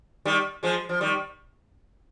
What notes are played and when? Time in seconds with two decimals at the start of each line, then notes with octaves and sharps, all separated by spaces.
0.25 D#3 G3
0.63 F3 G#3
0.89 F3
1.01 D#3 G3